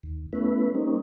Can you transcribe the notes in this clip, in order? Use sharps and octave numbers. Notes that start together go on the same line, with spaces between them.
D#2
A3 B3 C#4 E4 B4
G3 A#3 C4 C#4 D#4